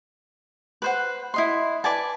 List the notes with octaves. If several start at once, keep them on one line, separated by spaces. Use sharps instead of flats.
B4 C5 F#5
E4 D#5 C6
B4 D5 G#5 A5